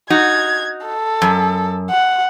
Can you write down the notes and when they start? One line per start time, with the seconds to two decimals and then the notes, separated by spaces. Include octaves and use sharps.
0.10 D#4 F#4 G#6
0.87 A4
1.22 F#2
1.90 F#5